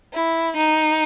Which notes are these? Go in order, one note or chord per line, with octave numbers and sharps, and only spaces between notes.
E4
D#4